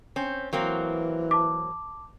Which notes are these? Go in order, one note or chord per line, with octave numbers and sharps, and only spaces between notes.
C4 C#4
E3 F#3 A#3 C4
A5 D6